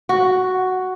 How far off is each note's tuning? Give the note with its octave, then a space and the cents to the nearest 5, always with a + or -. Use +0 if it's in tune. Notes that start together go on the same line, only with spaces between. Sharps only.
F#4 +5